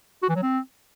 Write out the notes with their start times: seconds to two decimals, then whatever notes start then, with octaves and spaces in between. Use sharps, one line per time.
0.22 F#4
0.29 E3
0.36 F#3
0.42 C4